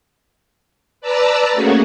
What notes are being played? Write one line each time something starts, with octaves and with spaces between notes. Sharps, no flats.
B4 D5 A5 A#5 E6
A3 A#3 C#4 F#4 G#4